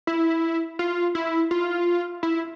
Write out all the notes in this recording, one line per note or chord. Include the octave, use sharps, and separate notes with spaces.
E4
F4
E4
F4
E4